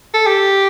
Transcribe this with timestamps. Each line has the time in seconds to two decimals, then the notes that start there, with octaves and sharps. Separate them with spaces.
0.14 A4
0.27 G4